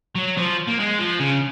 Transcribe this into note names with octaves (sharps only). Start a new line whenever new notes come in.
F#3
F3
A#3
G#3
F3
C#3